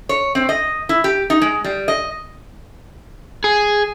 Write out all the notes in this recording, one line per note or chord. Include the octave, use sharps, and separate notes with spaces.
C#5
C4
D#5
E4
G4
D#4
G#3
G3
D#5
G#4